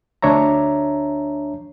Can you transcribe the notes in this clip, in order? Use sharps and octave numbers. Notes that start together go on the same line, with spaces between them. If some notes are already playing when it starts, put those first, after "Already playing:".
D2 D4 C#5 E5 A#5